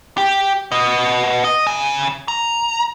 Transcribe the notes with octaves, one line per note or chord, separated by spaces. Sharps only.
G4
B3 D#5
D#5
C#3 G#5
A#5